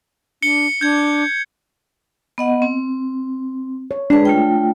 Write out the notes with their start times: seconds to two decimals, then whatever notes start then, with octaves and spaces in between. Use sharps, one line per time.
0.43 D4 C#7 G7
0.81 D4 G6 G#6
2.38 B3 D#5 F#5
2.62 C4
3.91 C#5
4.10 G#3 D4 G#4 B4
4.25 A3 F4 G5